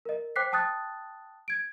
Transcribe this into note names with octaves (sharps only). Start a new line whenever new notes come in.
A#4 D#5
C5 G5 D6 F#6 B6 C7
G5 A5 D#6 F#6 A6
G#6 D7